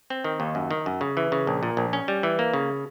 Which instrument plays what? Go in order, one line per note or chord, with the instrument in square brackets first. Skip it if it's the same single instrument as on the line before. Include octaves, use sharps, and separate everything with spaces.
[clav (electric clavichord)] C4
D#3
D#2
F#2
D#3
F#2
C#3
E3
C#3
A#1
A#2
A#1
C#4
G3
E3
A#3
C#3